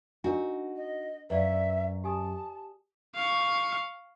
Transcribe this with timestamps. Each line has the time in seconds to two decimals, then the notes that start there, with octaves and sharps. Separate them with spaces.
0.24 D4 D#4 F#4 A#4
0.76 D#5
1.30 F#2 B4 D5 E5 F5
2.04 G4 G#5 A5 D#6
3.16 F5 C#6